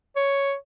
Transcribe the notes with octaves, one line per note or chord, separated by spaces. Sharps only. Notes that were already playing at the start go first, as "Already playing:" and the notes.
C#5